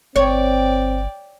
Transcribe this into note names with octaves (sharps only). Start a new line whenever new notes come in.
G1 C4 C#5 D5 G5